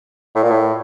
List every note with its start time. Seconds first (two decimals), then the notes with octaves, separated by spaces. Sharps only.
0.35 A2
0.43 A#2
0.51 A2